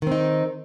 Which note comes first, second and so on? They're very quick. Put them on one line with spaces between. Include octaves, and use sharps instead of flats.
D#3 C4 D#4